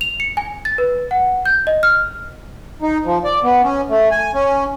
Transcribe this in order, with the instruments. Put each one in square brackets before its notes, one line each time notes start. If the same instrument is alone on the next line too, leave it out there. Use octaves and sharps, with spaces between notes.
[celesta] F7
C#7
G#5
A6
B4
F#5
G6
D#5
F6
[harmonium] D#4
F3
D5
B3
C#4
A3
G#5
C#4